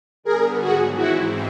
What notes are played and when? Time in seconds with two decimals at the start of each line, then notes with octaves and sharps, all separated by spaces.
0.23 D3 G3 B3 G#4 A#4
0.60 G#2 D#3 F#3 F#4 G#4
0.96 G#2 E3 G#3 C4 E4 F#4